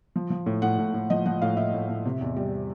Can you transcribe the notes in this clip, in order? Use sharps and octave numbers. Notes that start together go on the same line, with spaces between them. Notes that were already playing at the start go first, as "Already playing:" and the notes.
F3
F3
A2
A2 F#5
A2
A2
F3 D#5
F3 F#5
A2 F5
A2 E5
A2
A2
C3
E2
G3